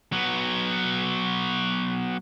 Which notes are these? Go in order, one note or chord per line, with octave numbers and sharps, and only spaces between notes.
F#3 B3